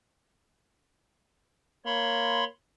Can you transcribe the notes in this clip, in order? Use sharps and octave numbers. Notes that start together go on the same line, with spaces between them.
A#3 C#5 B5 C6